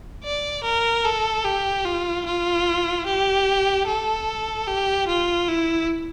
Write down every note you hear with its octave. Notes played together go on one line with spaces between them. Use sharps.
D5
A#4
A4
G4
F4
F4
G4
A4
G4
F4
E4